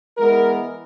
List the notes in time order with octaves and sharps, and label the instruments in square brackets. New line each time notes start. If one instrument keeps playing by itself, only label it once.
[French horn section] E3 G#3 B3 A#4